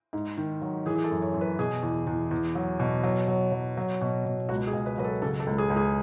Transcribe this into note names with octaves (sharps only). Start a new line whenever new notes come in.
G#2
D#3
F#3
E3 G#4
G#4
A4
F#2
C#5
F#2
B4
B2 G#4
E2
E2
E2
F#3
B2
F#3
F#3
F#3
F#3
B2
B2
C#2 F#4
G#4
C#2
B4
F#3 B4
A4
C#3 A4
A4
C#2
G#4
C#2
G#4